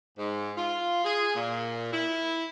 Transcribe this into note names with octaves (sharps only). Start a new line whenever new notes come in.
G#2
F4
G#4
A#2
E4